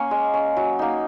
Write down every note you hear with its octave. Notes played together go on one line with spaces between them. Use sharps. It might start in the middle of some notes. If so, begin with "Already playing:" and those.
Already playing: A#3 C#4 G#5 C#6
G#3
C#4
F#3
A#3 D#4